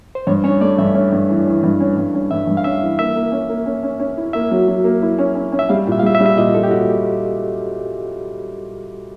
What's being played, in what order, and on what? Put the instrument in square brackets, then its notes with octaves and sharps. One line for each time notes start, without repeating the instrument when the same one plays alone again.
[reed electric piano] C5
[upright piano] G2 [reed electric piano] C#5
[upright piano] C#4 [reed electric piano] C#5
[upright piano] A3 [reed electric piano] D5
[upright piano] G2 [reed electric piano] E5
[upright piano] C#4
G2
E3
E3
G2
C#4
G2
C#4
[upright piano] G2 [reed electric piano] E5
[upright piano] G2
[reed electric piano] F5
[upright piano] C#4 [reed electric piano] E5
[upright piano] E3
[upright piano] A#3 [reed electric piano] E5
[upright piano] A#3
C#4
A#3
C#4
C#4
C#4
E4
[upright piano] A#3 [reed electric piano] E5
[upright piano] F#3
F#3
A#3
E4
C#4
C#4
C#4
[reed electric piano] E5
[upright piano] G3 [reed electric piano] F5
[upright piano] A#2
[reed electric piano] E5
F5
[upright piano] G3 [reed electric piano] E5
[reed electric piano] E5
[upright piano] G3
[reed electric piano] E5
[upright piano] A#2 [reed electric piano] D#5
[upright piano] A#2 [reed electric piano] A4
[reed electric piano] G4
[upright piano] A#2 [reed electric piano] F#4